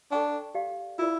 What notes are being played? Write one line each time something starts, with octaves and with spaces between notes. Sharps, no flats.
D4 A4 D5 G5 C#6
G4 D5 F5
E4 F4 A#4 D5